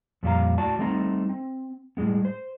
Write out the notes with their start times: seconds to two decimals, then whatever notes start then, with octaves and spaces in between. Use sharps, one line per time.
0.23 F2 A#2 G3 F4 F5 A#5
0.58 A2 F#4 D5 A5
0.79 G3 A3 C4 D#4 C#5 A#5
1.29 C4
1.97 A2 G3 G#3 B3
2.25 C5